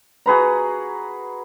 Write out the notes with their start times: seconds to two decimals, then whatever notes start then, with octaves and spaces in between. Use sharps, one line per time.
0.26 F#4 G#4 B4 A#5